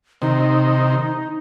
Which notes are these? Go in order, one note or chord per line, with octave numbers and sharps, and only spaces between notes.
C3 D#3 D#4